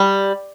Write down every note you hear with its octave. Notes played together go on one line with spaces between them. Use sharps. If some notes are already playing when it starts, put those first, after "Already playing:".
Already playing: G3